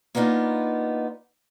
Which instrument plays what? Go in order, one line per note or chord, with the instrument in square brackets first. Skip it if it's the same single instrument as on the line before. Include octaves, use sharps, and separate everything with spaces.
[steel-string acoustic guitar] A#3 B3 D4 D#4 F4